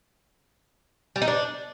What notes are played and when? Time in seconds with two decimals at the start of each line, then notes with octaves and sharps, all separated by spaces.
1.16 G3
1.22 D#4
1.28 D4